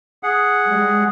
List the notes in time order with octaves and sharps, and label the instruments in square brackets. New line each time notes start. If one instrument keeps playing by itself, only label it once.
[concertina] G#4 F#5
[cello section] G3 G#3